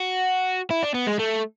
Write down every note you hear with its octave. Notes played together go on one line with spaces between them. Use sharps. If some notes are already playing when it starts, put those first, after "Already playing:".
Already playing: F#4
E4
D4
B3
G#3
A3